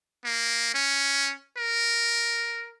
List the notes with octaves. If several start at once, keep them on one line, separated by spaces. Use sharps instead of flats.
A#3
C#4
A#4